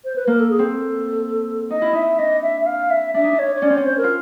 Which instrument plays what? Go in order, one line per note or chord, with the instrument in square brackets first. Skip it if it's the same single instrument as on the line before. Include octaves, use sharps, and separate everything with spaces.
[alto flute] C5
B4
[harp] A#3 [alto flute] A#4
[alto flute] A4
G#4
[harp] C4 [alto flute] A4
[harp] D#4 [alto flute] D#5
[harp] E4
[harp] D#4 [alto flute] E5
[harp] D4 [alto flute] D#5
[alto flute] E5
E5
F5
E5
[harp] D4 [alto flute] E5
[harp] D#4
D4
[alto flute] C#5
C#5
[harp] C#4 [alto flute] D5
[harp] C4
[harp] C#4 [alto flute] C#5
[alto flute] C5
A#4
[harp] F4